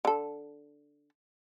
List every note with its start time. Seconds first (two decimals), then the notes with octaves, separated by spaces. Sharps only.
0.05 D3 A4